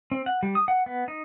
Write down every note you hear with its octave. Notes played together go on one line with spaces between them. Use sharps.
C4
F#5
G3
D#6
F#5
B3
D#4